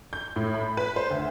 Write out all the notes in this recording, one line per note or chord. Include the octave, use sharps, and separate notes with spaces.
G6
A2
B5
B4
C5
D2